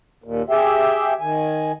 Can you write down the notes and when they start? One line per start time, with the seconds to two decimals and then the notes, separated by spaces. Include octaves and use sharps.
0.24 D#2 A#2
0.50 G4 G#4 E5 G5
1.21 D#3 G#5